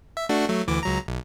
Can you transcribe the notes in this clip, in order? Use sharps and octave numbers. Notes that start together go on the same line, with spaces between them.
E5
A3 D4 F#4
F#3 A3
D2 E3 D6
C#2 F#3 A#5
B1